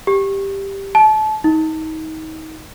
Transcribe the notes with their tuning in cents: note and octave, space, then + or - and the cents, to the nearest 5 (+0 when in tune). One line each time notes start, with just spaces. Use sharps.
G4 +5
A5 -30
D#4 +30